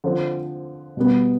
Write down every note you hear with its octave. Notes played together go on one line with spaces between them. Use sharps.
D3 F3 C4
B2 G3 B3